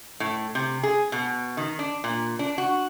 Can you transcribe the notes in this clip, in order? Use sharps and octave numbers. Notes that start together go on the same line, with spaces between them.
A2
C3
G#4
B2
D#3
D4
A#2
D4
F#4